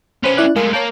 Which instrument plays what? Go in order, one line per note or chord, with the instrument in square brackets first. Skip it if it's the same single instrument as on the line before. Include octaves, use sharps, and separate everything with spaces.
[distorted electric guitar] C#4 B4 [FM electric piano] C5 C6
[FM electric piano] E4 D5 F#6
[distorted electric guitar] G#3 A3 [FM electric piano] A#4 F5 G#5
[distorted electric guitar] A#3 A#4 [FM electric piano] C#5 A5 G6